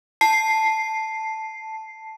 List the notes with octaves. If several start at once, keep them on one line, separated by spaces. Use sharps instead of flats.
A5 C7